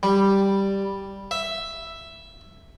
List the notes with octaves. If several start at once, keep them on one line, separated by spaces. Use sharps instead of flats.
G3
E5